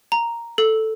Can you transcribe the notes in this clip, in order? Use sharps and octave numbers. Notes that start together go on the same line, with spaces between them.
A#5
A4